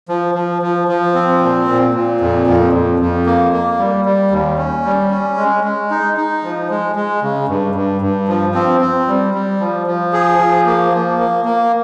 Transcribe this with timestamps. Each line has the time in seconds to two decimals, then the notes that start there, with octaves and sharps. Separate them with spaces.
0.09 F3
0.35 F3
0.62 F3
0.88 F3
1.15 C4
1.41 A#2
1.68 A#2
1.94 A#2
2.21 F2
2.47 F2
2.73 F2
3.00 F2
3.26 A#3
3.53 A#3
3.79 G3
4.05 G3
4.31 D#2
4.58 C#4
4.84 G3
5.10 C#4
5.37 G#3
5.64 G#3
5.91 D#4
6.17 D#4
6.44 F3
6.70 G#3
6.96 G#3
7.22 C#3
7.49 G2
7.75 G2
8.01 G2
8.28 F3
8.55 C4
8.81 C4
9.08 G3
9.34 G3
9.60 F3
9.87 F3
10.13 G#4
10.39 F3
10.66 A#3
10.93 F3
11.18 A#3
11.45 A#3